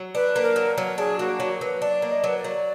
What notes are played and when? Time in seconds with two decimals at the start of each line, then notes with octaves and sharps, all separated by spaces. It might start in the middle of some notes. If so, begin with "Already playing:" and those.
Already playing: F#3
0.15 D4 B4
0.36 A#3
0.43 A#4
0.56 F#3
0.78 F#3
0.98 D4 G#4
1.19 A#3 F#4
1.40 F#3
1.61 F#3 B4
1.82 D4 D5
2.02 A#3
2.10 D#5
2.24 F#3 B4
2.37 D5
2.44 F#3